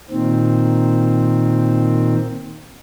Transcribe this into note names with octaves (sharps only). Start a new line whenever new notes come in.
A#2 D#3 C4